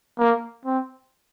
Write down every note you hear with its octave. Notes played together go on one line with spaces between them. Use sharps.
A#3
C4